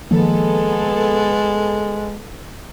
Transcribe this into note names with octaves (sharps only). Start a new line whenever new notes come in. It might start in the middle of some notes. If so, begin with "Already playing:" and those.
D#3 F3 G#3 A#3 B3 A4